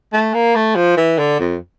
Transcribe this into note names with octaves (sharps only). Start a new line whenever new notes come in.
A3
A#3
A3
F3
E3
D3
F2